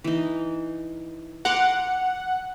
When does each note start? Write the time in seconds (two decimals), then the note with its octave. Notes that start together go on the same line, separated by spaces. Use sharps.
0.04 E3 D#4
1.45 F#5 A#5 C6 D6